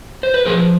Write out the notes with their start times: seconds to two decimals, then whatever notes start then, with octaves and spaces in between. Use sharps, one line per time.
0.23 C5
0.34 B4
0.45 F3 G#4 A#4